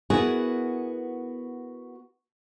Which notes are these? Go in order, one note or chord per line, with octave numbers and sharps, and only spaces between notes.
B3 E4 F#4 G#4 A#4 B4